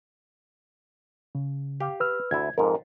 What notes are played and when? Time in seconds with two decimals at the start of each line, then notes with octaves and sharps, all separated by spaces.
1.35 C#3
1.80 G4 F5
2.00 B4 E6 F6
2.31 D2 E4 G#6
2.58 F2 G#2 A#4